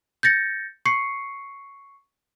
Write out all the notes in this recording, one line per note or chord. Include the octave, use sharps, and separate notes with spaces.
G6 A6 A#6 C#7
C#6 C7 C#7